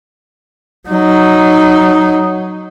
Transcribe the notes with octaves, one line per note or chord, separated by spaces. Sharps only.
F#3 D#4